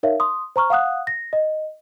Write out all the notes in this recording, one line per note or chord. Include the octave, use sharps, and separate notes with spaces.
D#4 A#4 C#5 E5 F5
C6 D#6
C5 A#5 C#6 F6
F5 F#5 D#6 F#6
A#6
D#5